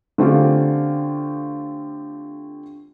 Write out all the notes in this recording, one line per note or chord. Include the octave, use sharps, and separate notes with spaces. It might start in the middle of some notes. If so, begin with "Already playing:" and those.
D3 A3 C4 C#4 F4 G4